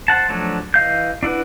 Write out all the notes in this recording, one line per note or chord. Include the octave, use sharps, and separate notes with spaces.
C5 F#5 A5
F3 F#3 A3 D4
E3 D#5 F5 G6
D4 E4 F#4 B4